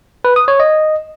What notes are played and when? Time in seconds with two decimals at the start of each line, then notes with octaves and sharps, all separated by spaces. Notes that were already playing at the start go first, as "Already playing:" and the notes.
0.25 B4
0.36 D#6
0.48 C#5
0.60 D#5